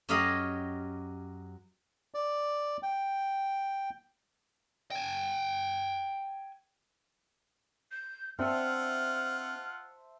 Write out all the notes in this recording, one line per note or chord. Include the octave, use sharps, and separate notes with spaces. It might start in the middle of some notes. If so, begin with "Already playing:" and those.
F#2 G4 C#5 D#5 F5 B5
D5
G5
G5 G#5
G6
C4 D4 F4 C5 E5 F#5 A5 F6